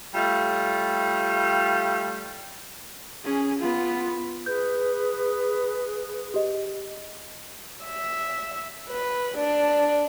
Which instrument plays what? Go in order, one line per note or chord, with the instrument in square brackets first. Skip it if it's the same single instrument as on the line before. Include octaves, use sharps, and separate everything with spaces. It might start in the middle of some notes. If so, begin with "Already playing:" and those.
[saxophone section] G3 A3 F4
[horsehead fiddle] C#4 G#4
B3 F4
[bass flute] G#4 [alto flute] B4 [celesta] G6
[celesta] G4 D#5
[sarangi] E5
B4
D4